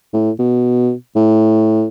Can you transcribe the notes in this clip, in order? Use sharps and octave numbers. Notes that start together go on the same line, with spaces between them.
A2
B2
A2